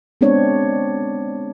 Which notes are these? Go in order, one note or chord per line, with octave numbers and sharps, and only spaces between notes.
G#3 B3 C4 D4 C#5